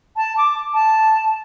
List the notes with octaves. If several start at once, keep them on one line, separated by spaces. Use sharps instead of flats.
A5
D6
A5